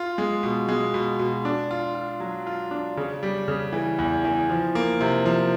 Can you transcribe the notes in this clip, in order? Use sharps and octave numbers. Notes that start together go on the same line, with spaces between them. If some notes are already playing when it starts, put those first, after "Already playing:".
Already playing: F4
G#3
B2
G#3
B2
B2
D4
F4
F4
F#3
F4
D4
C#3
G3
C#3
E3
E2
E3
F3
A#3
C3
F3